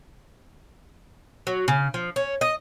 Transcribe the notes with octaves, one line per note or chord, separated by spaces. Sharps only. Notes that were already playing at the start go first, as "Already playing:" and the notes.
F#3
C#3
F3
C#4
D#5